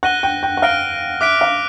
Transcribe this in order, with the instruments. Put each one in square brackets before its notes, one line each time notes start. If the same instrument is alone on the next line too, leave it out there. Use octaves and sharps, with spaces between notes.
[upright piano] F#5 [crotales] F#6 A#6 D#7 G7
[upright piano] G5
G5
F#5
[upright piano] F5 [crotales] F6 A#6 D7 G7
[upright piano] E5 [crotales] D6 F#6 B6 D7
[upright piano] F5